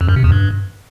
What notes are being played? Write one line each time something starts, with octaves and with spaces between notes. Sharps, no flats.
F2
F#2
C3
E2
G2